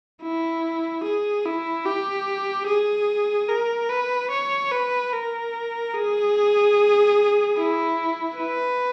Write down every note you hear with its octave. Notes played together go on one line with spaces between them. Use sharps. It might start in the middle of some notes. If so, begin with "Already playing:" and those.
E4
G#4
E4
G4
G#4
A#4
B4
C#5
B4
A#4
G#4
E4
B4